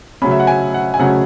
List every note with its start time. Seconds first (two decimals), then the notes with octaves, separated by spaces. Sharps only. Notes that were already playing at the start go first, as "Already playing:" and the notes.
0.22 C#3 F#3 A3 C#4 B5
0.31 E5
0.40 F#5
0.47 G#5
0.74 F#5
0.94 G#5
0.99 C#3 F#3 A3 C#4 F#5